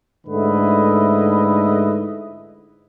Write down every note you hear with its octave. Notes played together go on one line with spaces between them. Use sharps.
G#2 D3 A3 E4 B4 D#5